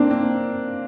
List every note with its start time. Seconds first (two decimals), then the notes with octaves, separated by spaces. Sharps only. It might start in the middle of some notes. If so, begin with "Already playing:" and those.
Already playing: A#3 C4 D4
0.11 C4